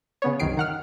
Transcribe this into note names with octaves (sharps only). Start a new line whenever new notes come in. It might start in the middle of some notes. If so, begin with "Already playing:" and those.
C#3 B3 C#5
C2 F#2 D#3 C7 D7
D#3 F#5 F6